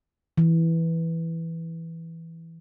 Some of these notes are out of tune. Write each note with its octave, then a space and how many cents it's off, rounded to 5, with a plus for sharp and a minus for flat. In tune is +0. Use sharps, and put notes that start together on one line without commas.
E3 -5